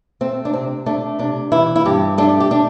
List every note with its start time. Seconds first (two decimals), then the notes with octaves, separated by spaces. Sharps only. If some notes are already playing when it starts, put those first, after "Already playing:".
0.21 A3 C4
0.45 D4
0.53 C3 C4
0.86 A3 D4
1.19 C3 D4
1.52 E3 E4
1.76 E4
1.86 G2 G4
2.18 A3 D4
2.40 G4
2.51 D4